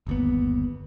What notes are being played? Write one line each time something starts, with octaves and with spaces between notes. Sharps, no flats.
G1 D#2 B3